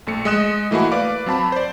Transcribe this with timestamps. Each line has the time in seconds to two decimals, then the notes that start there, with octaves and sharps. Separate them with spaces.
0.07 A#1 A3 C#7
0.25 G#3 D#5 D#6 F#6 E7
0.71 E3 A3 A#3 E4 F#4
0.92 B4 D5 F5 D6
1.26 F#3 C4 A5 B5
1.52 C5 D5